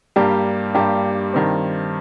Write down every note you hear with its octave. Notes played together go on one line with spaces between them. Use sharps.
G2 G3 A#3 G4
G2 G3 A#3 G4
G2 D#3 C4